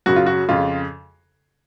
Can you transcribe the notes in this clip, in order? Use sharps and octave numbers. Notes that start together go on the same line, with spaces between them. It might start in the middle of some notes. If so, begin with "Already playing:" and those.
F#2 C#3 F#4
F4
F#4
F2 C#3 F4